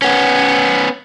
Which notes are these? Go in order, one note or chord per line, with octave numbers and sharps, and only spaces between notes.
B3 C#4